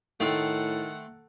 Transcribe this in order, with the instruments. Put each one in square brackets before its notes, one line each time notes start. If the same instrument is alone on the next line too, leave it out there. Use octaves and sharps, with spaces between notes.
[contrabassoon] A2 [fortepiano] D#3 [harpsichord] A3 C4 [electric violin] A4 F#5